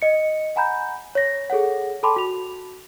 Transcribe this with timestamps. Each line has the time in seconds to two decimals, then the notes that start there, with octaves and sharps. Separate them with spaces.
0.02 D#5 C#7
0.56 F#5 G#5 A#5 B5 G6
1.15 C#5 A#6
1.50 G#4 A4 C#5 F#5
2.03 A4 G5 A5 B5 C6 D6
2.16 F#4 F7